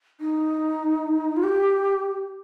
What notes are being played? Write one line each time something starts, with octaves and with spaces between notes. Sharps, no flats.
D#4
F4
G4